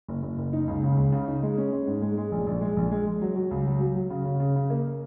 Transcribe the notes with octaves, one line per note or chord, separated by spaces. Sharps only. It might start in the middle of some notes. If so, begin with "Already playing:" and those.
F#1
F#1
F#1
D#4
C#2
C#3
C#2
C#3
D#4
G#3
C#4
G#3
G#2
G#3
G#3
A#1
A#1
G#3
A#1
G#3
G#3
F#3
F#3
C#2
F#3
F#3
F#3
C#3
C#3
C#3
C#3
A#3